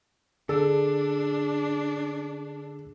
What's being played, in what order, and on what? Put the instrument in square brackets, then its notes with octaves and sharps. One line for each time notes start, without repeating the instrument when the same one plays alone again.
[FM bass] D3 [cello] D4 [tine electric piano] G#4 [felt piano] A4